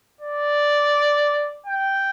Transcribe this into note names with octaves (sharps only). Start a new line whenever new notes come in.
D5
G5